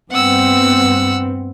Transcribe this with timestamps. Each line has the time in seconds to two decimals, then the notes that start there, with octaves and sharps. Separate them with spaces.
0.11 G2 B3 C4 F#5 E6